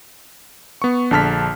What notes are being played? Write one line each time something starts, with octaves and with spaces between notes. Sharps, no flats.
B3 C#6
A#1 D3 A5 F6 B6